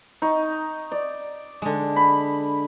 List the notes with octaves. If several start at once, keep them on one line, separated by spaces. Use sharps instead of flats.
D#4 C#6
D5
D3 G#3
B5